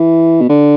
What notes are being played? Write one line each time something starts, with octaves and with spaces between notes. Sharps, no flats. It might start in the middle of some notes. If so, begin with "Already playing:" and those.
Already playing: E3
B2
D3